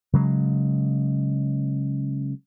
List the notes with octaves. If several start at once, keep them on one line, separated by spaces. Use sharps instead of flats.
C#3 F#3 G#3